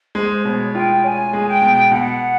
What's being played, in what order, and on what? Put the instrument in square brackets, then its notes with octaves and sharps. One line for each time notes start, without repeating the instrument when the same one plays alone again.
[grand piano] G#3 [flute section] C5
[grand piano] B2 [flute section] C#5
[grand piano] F4 [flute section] G5
[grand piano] C#4 [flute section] G#5
[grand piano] G#3
[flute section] G5
[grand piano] B2
[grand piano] B2 [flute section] F#5